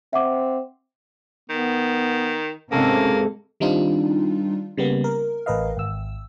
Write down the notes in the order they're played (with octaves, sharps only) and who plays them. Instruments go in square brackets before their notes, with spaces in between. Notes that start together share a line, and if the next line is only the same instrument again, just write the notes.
[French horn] C4 [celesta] E5 F#5 D6
[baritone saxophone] D#3 [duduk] B3
[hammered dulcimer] G#2 A4 [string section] C3 [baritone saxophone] A#3 [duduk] C#4
[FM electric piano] D#3 G3 C4 D4 D#4 F4
C#3 G3 A#3 B3
A#4
A1 A#4 B4 D#5 F5
G#1 E6